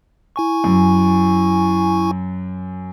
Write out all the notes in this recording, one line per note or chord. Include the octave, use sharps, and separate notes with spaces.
E4 G#5 C#6
F#2